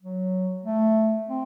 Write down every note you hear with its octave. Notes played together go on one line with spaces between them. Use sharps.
F#3
A3
C4